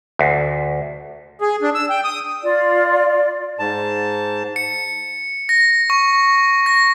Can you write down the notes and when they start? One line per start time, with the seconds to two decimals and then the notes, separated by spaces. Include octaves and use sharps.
0.19 D2
1.41 G#4
1.62 D4
1.75 E6
1.90 G5
2.04 D#6
2.44 F4 D5
3.59 G#2 A5
4.56 C#7
5.49 A#6
5.90 C#6
6.66 A#6